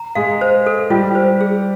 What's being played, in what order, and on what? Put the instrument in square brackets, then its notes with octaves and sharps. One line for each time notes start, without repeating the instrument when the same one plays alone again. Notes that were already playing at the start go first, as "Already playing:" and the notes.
Already playing: [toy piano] A#5
[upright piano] G#3 G#4 [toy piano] F5
[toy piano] C5
A4
[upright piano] G3 G4 [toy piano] F4
[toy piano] C5
G#4